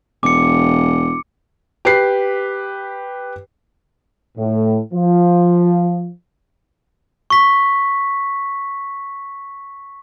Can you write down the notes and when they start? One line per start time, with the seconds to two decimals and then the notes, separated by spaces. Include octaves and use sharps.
0.23 E1 D6 C#7
1.85 G4 B4 C7
4.37 A2
4.93 F3
7.30 C#6 B6